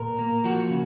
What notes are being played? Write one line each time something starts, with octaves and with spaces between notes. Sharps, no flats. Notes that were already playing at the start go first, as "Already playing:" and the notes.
Already playing: A#2 A#4
A#3
F3 F#4
C#3